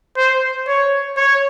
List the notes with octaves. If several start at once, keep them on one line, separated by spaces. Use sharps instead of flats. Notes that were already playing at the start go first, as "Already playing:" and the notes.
C5
C#5
C#5